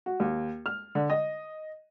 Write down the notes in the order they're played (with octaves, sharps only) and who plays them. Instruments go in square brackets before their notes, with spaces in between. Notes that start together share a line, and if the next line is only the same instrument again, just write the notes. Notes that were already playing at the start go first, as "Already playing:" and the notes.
[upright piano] F#4
D#2
F6
D3
D#5